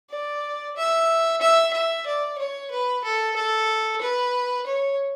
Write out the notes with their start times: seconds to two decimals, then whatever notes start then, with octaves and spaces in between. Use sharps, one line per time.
0.10 D5
0.76 E5
1.42 E5
1.73 E5
2.07 D5
2.38 C#5
2.71 B4
3.05 A4
3.36 A4
4.01 B4
4.67 C#5